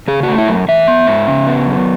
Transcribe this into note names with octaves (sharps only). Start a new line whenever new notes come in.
C#3 G#4
F#4
A3
E4
F#2
E3 E5
B3
G#2
C#3
B3
F#2